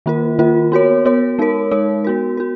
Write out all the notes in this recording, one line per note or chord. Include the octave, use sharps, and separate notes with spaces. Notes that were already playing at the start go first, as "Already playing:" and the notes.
D#3 A#3 F4 A#4
D#3 A#3 F4 A#4
B3 F#4 A#4 C#5
B3 F#4 A#4 C#5
G#3 D#4 A#4 C#5
G#3 D#4 A#4 C#5
B3 F#4 A#4
F#4 A#4